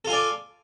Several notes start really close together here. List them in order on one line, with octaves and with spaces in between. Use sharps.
A4 F4 G#5 D5